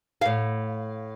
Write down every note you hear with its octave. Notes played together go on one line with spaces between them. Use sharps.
A2 F5